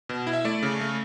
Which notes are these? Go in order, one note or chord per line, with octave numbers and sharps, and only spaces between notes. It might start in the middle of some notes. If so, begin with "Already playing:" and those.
B2
E4
E5
A3 D5
C#3
A3